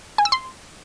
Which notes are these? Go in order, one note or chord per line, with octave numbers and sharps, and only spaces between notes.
G#5
E6
C6